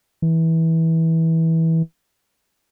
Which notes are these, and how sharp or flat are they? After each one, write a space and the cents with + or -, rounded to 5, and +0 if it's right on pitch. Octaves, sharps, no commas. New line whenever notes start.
E3 -20